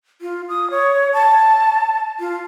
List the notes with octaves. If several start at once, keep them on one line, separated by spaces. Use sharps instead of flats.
F4
D#6
C#5
A5
F4